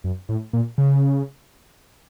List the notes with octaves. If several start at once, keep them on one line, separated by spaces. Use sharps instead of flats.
F#2
A2
A#2
C#3